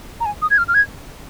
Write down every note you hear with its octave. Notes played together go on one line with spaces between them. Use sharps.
A#5
G#5
D#6
G#6
F6
F6
G#6